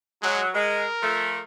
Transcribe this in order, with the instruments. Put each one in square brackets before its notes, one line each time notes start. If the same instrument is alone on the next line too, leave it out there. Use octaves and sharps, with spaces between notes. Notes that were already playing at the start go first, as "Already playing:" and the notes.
[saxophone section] F#3 [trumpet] G#3
[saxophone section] G#3 [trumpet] A#4
[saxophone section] F3 A3